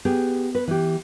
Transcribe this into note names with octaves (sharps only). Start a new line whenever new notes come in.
B3 G4 G#4
B4
E3 G4